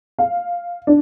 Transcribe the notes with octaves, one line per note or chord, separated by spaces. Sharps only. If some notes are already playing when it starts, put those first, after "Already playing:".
F5
D4